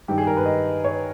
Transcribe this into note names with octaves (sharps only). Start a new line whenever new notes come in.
G2 D#3 G4
G#4
A#4
B4
D#5
C#5